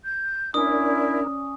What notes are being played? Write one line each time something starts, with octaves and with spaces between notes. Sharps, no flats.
G6
C#4 D4 E4 A#4 D5 D#6